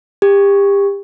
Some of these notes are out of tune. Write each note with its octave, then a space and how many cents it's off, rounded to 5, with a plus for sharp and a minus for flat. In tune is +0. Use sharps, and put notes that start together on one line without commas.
G4 +30